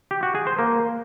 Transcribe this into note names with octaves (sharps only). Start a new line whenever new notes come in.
G4
F#4
G#4
C5
A#3